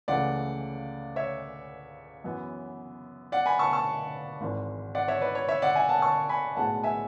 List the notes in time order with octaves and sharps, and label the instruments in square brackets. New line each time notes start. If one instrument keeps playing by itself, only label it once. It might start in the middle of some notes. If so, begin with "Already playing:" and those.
[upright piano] C#2 C#3 E3 A3 D5 F#5
C#5 E5
F#2 E3 B3
D5 F#5
G#5 B5
A5 C#6
A5 C#6
G#1 G#2 E3
D5 F#5
C#5 E5
B4 D5
C#5
C#5 E5
D5 F#5
E5 G#5
F#5 A5
A5 C#6
G#5 B5
B1 A2 G#3 B3 F#5 A5
E5 G#5